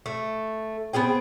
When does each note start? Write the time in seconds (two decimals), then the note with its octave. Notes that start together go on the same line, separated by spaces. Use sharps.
0.06 A3
0.93 B3 C4 G#4 G5